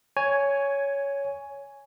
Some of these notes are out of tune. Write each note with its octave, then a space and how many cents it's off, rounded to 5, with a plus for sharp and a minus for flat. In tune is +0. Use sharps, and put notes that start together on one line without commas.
C#5 +10 G#5 +0